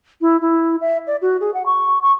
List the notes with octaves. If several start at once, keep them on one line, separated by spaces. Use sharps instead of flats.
E4
E4
E5
D5
F#4
G#4
F#5
C#6
C#6